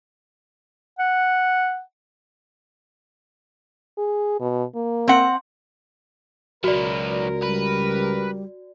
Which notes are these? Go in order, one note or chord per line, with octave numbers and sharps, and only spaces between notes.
F#5
G#4
B2
A#3
C4 F#5
C#2 F#3 F#4 A#4 B4 D5
G3 B4